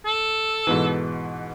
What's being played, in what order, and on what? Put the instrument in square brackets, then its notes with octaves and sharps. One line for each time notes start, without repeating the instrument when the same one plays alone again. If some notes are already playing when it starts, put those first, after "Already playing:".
[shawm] A4
[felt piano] G#2 B2 E3